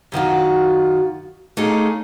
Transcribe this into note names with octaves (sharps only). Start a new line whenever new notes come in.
F#2 D#3 F4 F#4
A3 A#3 C#4 D#4 G#4